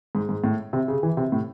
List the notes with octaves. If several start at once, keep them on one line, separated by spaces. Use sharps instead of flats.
G#2
G#2
A2
C3
C#3
E3
C3
A2